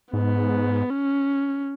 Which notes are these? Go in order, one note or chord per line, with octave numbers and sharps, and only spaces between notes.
G#2 B3
C#4